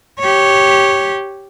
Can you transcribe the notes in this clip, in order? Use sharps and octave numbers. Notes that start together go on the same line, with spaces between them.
G4 C#5